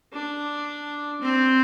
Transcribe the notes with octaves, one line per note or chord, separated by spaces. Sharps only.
D4
C4